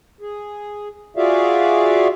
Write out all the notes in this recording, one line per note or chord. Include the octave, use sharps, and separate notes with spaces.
G#4
F4 F#4 G#4 D5 E5 F5